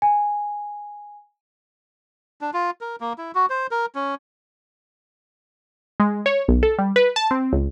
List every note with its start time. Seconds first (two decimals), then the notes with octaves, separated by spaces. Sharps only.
0.02 G#5
2.41 D4
2.54 F4
2.81 A#4
3.00 A#3
3.18 E4
3.35 F#4
3.50 C5
3.71 A#4
3.95 C#4
6.00 G#3
6.26 C#5
6.48 B1
6.63 A4
6.79 G3
6.96 B4
7.16 A5
7.31 C4
7.53 C#2